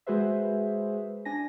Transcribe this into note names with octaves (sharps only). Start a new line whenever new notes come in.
G#3 F#4 G#4 B4 C5 E5
D4 G#5 A#6